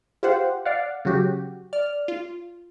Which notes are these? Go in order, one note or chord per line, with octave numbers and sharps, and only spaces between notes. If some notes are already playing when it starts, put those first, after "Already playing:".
F4 G4 C5 F#5
D5 F5 F#5
C#3 F#3 F#4 G4
D5 F6
F4